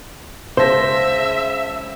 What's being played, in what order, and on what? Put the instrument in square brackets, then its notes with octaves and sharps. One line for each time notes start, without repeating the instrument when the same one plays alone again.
[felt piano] C#2 A5 A#6 [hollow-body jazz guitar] C5 [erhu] E5